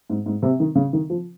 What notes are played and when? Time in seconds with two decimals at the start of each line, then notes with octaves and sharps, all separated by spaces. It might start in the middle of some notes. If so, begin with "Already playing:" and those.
0.10 G#2
0.26 G#2
0.42 C3
0.60 D#3
0.75 C#3
0.93 D#3
1.10 F3